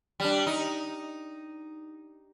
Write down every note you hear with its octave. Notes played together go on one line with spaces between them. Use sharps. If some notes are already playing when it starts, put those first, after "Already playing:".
G3 D4
D#4